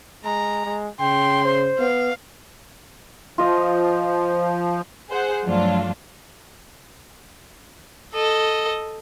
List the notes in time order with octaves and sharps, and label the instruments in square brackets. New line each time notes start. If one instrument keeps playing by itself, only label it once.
[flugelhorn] G#3 [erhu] A#5
[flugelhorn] G#3
[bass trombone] C#3 [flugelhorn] G5 [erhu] C6
[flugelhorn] C5
[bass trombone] B3 [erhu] F5
[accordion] F3 [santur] F4 D#5
[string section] G#4 C5 F#5
G2 F3 F#3 A3 D4 F4
[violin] A4 D#5